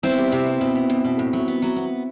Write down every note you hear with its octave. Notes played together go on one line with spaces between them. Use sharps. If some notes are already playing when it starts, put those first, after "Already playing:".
B3 C4 E4
G3
C3
B3
B2
B3
B2
B2
A2
F#3
B3
F#3
B3